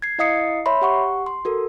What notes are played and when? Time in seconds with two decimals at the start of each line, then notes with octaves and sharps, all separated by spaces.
0.02 G#6 C7
0.19 E4 D#5 F5 D#6 C7 C#7
0.66 C#5 E5 B5 C6
0.82 G4 F#5 C#6
1.26 C6
1.45 F#4 A4 A#4